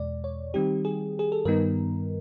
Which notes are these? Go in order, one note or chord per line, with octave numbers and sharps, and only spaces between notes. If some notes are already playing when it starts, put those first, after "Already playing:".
Already playing: E2 B2 G#3 D5
C#5
D#3 G3 C4 D#4 G4
G#4
G#4
A4
G2 D#3 G3 B3 D#4 A#4